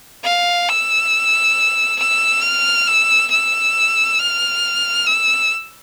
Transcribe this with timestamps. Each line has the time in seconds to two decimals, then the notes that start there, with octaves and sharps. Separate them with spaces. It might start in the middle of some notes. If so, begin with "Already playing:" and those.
0.24 F5
0.68 E6
2.00 E6
2.43 F6
2.88 E6
3.31 E6
4.19 F6
5.06 E6